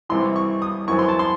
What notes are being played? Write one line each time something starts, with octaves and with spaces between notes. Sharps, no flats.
C2 C3 E3 C6
C#6
D#6
F#2 E3 C4 C#6
C6
A5
C6